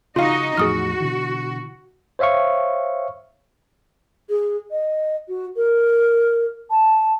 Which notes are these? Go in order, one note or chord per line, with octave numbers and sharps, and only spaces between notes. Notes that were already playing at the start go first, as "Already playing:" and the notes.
C#3 D#4 F4 F#4 D#5 F5
E2 A2 F3 F#4 G#4 D#6 F6
B2 D3 E3
C5 C#5 E5 F5 C#6
G#4
D#5
F#4
A#4
A5